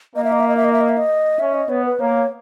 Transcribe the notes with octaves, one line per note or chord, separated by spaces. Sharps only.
A#3 D#5
E5
D#5
E5
D#5
E5
D#5
E5
D#5
E5
D#5
C#4 E5
D#5
B3 C#5
B4
A#3 C#5